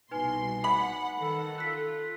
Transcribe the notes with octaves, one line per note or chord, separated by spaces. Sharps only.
C2 B2 D#4 B4 G#5 C6
F#5 B5
D#3 A4 F#5
F4 F#6 B6